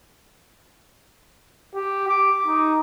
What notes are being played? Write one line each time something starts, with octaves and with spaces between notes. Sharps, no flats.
G4
D6
D#4